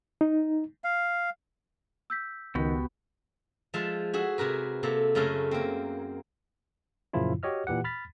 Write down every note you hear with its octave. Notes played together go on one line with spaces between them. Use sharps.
D#4
F5
E6 G6 B6
C#2 D#3 B3 F#4 G4
F3 G#3 E5 A5 C6
F#4 G#4 E5
C3 G#4 A#4 B4
C3 A#3 A4
F#2 C#3 A3 A4 A#4 G#5
A#3 C4
F#2 A#2 C#3 F3 E4 F4
F#4 G4 C#5 D#5 F6
A#2 E3 G4 F#5
B5 F6 A6 B6